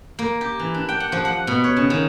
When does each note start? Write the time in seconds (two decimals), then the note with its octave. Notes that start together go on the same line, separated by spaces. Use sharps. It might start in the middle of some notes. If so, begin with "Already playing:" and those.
0.19 A#3
0.41 G4
0.59 E3
0.74 D4
0.89 G5
1.00 F#5
1.12 F3
1.25 F#5
1.47 B2
1.64 C#5
1.76 C#3
1.90 D#3